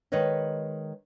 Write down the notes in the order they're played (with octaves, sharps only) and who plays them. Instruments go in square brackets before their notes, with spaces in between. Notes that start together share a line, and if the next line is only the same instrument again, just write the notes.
[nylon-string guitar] D#3 G#3 B4 C#5 D#5